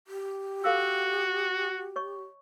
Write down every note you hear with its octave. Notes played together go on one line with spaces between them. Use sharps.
G4
F#4 A4 F5 E6
C#5 D#5 C#6